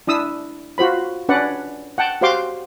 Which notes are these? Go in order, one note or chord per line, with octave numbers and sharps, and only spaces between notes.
D4 E4 D#6 E6
F4 F#4 C5 B5
C#4 D4 B4 D5 F#5
F#5 G5 A5
F#4 G4 C5 F5 C6 D6